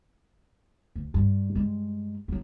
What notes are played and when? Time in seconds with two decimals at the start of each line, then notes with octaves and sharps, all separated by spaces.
0.96 D2
1.14 G2
1.55 G2 G#3
2.28 F#3 B3